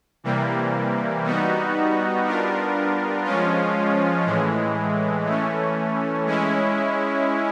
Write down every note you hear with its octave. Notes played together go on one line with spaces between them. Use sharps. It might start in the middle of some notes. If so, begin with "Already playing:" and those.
C3 E3 G3 A#3
G3 B3 D#4 F#4
G3 B3 D4 F4 A#4
F3 G#3 C#4 F4
A2 E3 G#3
E3 A3 C#4
G#3 C#4 E4